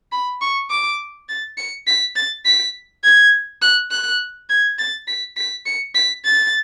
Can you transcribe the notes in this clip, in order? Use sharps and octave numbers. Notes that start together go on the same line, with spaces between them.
B5
C#6
D6
A6
C#7
B6
A6
B6
G#6
F#6
F#6
G#6
A6
B6
B6
C#7
B6
A6